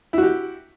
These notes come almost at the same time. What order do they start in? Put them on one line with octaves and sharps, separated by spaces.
E4 F#4 G4